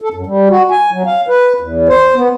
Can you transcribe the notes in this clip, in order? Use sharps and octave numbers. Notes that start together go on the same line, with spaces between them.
A4
F#2
G3
F#4
G#5
F#3
F5
B4
E2
C5
B3